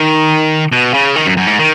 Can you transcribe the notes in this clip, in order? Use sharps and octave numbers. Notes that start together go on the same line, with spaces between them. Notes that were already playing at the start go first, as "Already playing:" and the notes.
Already playing: D#3
B2
C#3
D#3
F#2
F#2
G#2
D#3